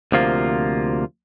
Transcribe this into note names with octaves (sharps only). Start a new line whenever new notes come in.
D2 C3 F3 A#3 F4